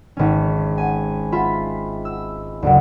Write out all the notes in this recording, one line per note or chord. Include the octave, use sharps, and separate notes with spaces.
G#1 C#4
G#5
F4 E5 B5
E6
F#1 D2